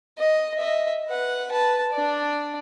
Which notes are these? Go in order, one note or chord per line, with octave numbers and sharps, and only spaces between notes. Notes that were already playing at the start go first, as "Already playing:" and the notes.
D#5
D#5 E5
B4 F#5
B4 A5
D4 D5